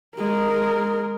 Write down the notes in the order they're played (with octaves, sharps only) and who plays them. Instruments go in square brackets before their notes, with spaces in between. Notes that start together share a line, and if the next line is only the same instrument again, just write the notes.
[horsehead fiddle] G#3 A#4